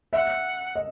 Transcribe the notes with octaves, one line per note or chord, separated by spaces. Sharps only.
E5 F#5
D#5